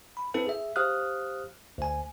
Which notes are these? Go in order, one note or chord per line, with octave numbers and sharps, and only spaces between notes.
B5
C4 E4 A4 B4
G#4 E5
G4 C5 F5 D#6 F6 F#6
D2 G#5